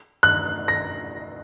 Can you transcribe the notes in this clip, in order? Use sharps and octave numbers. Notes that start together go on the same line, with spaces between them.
F#6
A#6